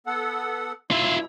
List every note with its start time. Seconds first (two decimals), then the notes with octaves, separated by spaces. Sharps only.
0.07 B3 A4 F#5
0.91 G2 B2 E4 F4 E5